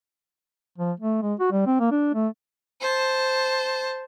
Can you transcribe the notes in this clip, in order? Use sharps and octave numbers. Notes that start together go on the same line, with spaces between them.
F3
A3
G#3
F#4
G3
C4
A#3
D4
A3
C5 A5